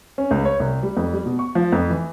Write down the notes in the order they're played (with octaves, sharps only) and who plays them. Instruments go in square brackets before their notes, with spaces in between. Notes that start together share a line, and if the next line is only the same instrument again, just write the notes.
[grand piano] C#4
C#2
C#5
C2
G3
F2
G3
B2
C#6
F3
F2
E3